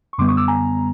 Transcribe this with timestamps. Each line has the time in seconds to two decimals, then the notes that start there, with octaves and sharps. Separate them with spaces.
0.13 C#6
0.18 F#2 D3 G3 B3 C6 D6
0.28 C#6 D#6
0.37 D6 E6
0.48 G#5 A#5